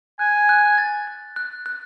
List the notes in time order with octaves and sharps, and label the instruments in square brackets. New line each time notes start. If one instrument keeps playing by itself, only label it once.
[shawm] G#5 [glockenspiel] F#6
[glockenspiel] F#6
A6
F#6
F#6
F#6